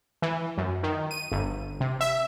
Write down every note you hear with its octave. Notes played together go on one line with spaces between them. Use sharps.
E3
F#2
D#3
D#7
G1
C3
E5